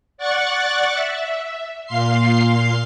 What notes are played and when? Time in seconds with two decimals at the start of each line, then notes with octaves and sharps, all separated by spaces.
0.18 D5 F#5 C#6 F#6 A6
0.92 E5
1.86 A#2 F5 C6 C7